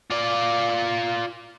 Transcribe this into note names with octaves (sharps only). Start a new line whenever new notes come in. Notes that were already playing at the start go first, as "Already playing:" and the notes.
F4 D5